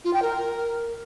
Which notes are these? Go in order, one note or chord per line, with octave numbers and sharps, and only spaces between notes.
F4
G5
A#4